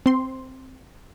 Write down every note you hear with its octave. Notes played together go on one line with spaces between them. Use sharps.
C4 C6